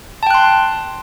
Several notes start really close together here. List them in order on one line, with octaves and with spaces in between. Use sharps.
A5 G5 F#6 C6